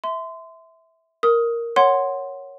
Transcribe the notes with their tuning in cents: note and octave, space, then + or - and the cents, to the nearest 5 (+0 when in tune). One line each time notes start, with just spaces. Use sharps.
E5 -15 C6 -25
A#4 +0 D#6 +15
C#5 +0 F#5 +0 C6 +0